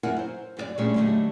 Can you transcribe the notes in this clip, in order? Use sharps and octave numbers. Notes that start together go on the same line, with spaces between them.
F#2 E4 F4 A#4 F#5 G#5
C5
F#2 G4 D5
A#2 G3 A3 C#4 D4 G#4
D3 F#3 G3 A3 D4 D#4